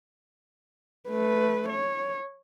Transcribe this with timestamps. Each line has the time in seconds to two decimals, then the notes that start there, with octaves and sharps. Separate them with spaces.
1.10 A3 B4
1.69 C#5